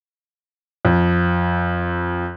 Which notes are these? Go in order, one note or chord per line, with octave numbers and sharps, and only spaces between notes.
F2